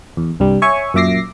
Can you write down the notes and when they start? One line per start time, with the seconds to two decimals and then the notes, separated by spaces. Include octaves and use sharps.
0.17 E2
0.40 C2 G2 G3
0.62 C#5 E5 G#5 C#6
0.94 F#2 A#2 E5 D6 A#6 C7